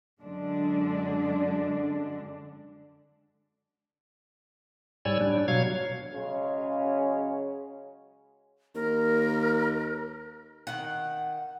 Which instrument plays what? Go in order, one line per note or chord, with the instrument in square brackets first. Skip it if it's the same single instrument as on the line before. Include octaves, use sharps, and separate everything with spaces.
[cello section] F#2 D3 G#3 D4
[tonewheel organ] G#2 G3 C#5 D5 G#5 E6
G3 D4
B2 F#3 C#5 F5 G#6
[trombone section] C#3 F#3 G#3 C#4
[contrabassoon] D#2 [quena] A#4
[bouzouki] D#3 F#5